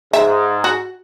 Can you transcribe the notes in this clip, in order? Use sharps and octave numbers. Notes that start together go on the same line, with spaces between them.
G#2 E5
F#4